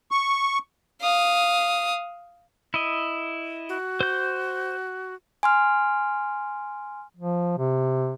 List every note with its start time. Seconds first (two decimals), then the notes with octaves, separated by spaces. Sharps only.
0.11 C#6
1.02 F5 D#6
2.74 E4 D#5
3.69 F#4
4.01 C5 G6
5.43 G#5 C6 F6
7.17 F3
7.58 C3